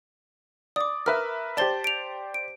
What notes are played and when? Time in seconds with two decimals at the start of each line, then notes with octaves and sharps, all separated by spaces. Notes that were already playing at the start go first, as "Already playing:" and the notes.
0.76 D5 D6 D#6
1.06 A#4 B4 E5 F6
1.57 G4 C5 D5 A5 A6 G7
1.84 D7 F7
2.34 D7